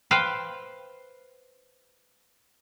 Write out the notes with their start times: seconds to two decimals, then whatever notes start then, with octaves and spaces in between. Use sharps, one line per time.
0.11 B4 C5 F5 G5